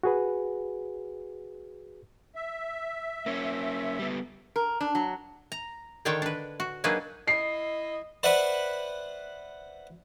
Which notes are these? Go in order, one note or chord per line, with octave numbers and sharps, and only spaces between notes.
F#4 G#4 B4
E5
A#3 C#4
G3 B3
A#4
D4
F#3
A#5
D3 D#3 D4 C#5 G5 A5
D4 B4
F#4
F#3 A#3 D4 D#4 G#4 B4
E4 D#5 C7
B4 C5 D5 E5 F#5 B5